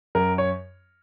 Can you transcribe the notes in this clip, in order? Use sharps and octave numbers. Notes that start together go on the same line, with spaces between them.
F#2 A#4
C#5